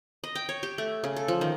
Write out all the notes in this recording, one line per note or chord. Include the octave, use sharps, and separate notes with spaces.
D#5
G5
C#5
G4
A3
C#3
A4
F3
D#3